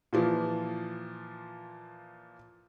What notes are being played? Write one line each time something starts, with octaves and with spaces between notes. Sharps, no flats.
A#2 E3 F3